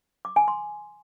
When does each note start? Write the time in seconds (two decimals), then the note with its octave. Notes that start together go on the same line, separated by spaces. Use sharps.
0.25 D6
0.36 G#5
0.48 C6